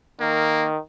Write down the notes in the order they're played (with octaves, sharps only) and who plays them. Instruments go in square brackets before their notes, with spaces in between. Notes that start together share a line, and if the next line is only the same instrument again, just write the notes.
[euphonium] D#3 [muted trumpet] A#3